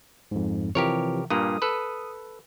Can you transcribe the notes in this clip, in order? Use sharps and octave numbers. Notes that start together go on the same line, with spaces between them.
F2 G#2
C3 E3 F3 G4 A#4 C#5
G2 A#2 A#3 D#6
A4 B4